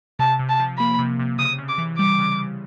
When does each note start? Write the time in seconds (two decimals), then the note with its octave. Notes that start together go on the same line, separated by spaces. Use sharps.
0.19 C3 A5
0.39 C3
0.49 A5
0.59 F3
0.79 A#3 B5
0.99 C3
1.19 C3
1.39 C#3 D#6
1.58 C#3
1.69 D6
1.78 E3
1.98 G3 D6
2.19 C#3
2.39 C#3